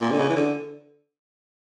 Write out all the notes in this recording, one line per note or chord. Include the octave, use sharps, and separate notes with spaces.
A#2
D3
C#3
E3
D3